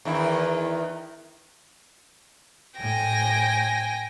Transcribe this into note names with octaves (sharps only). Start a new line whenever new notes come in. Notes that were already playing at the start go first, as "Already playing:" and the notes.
E2 D#3 E4
A2 G5 G#5 A#6